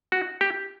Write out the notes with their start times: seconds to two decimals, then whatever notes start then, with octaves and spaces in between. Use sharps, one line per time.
0.12 F#4
0.41 G4